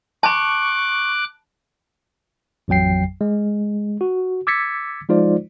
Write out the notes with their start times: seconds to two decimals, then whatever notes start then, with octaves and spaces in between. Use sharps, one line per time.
0.23 A5 B5 C#6 D6 F#6
2.68 A1 F2 F#3 G5 C7
3.21 G#3
4.01 F#4
4.47 D6 E6 G#6 A6 B6 C#7
5.09 F3 G#3 D#4 F4 C5 D5